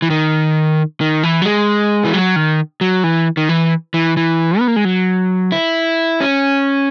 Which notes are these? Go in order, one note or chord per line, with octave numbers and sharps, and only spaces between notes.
E3
D#3
D#3
E3
F#3
G#3
E3
F#3
D#3
F#3
E3
D#3
E3
E3
E3
B3
A#3
G#3
F#3
E4
C#4